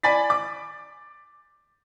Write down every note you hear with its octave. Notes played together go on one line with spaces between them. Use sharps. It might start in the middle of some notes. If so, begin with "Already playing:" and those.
D5 G#5 B5 A6 B6
D6